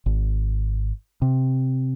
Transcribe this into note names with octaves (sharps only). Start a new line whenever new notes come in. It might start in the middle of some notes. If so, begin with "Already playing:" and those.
G#1
C3